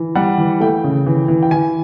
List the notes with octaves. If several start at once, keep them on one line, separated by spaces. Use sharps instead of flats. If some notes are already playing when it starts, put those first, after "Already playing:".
Already playing: E3
G3 F#5
E3
A3 G5
C#3
E3
E3
G5
E3 G#5